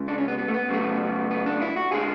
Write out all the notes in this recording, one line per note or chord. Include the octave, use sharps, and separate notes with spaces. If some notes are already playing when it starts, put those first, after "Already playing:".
Already playing: C#3 G#3
D4
C#4
B3
B3
A3
B3
C#3 F#3 A3
B3
D4
E4
F#4
D3 G#3 G#4